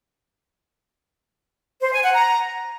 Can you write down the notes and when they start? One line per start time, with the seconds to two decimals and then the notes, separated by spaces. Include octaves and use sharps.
1.81 C5
1.92 G#5
2.03 F#5
2.14 A#5